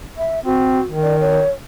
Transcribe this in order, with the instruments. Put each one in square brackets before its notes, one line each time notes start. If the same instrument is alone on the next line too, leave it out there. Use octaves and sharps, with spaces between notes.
[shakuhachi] E5
[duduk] C4 [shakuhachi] F#4
[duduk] D#3
[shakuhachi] D5
C#5